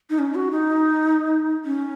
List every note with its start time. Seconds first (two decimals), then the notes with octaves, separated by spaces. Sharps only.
0.10 D#4
0.19 C#4
0.35 F#4
0.51 D#4
1.65 C#4